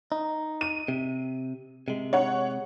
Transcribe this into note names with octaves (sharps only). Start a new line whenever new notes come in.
D#4
D#7
C3
C3 G#3
C#5 F#5